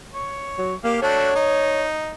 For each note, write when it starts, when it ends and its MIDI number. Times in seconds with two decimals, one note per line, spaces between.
0.14 0.74 73
0.58 0.74 54
0.84 1.02 58
0.84 1.02 67
0.84 1.02 77
1.02 1.31 57
1.02 1.31 62
1.02 1.31 66
1.02 1.84 73
1.35 2.14 63